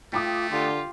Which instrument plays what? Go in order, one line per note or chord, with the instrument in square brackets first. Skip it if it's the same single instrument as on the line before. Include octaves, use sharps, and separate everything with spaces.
[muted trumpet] A3 [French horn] F4 [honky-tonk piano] G5 D6 D#6
[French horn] D3 [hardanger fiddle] F4 G4